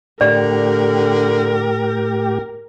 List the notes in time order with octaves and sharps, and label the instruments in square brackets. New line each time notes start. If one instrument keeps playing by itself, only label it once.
[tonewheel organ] A2 G4 [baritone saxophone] D3 [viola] A#4 [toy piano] D5